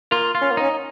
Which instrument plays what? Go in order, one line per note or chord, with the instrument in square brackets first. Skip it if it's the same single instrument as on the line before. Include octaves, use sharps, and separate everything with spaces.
[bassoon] A#3 [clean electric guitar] F4
[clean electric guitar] F4
[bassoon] C#4
A#3
[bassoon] C#4 [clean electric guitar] D#4